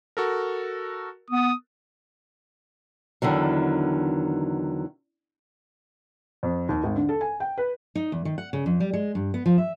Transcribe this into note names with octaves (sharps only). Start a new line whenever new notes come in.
F#4 A4 A#4
B3 D#6
E2 D3 D#3 F#3
F2
D#2
G#1
D3
A4
G#5
G5
B4
D#4
E2
D#3
F#5
C#3
F2
G3
G#3
G2
B3
F3
E5